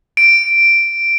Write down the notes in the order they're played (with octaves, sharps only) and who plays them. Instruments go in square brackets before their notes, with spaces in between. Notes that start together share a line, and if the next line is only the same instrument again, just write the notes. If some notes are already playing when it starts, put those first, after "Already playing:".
[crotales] D7